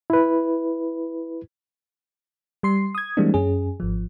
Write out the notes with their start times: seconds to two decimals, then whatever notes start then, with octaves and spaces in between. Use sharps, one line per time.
0.10 E4 B4
2.63 G3 C6 C7
2.95 D#6 G#6
3.17 E3 G3 G#3 A#3 C4 D4
3.34 F#2 C#4 G#4
3.80 G#1 F3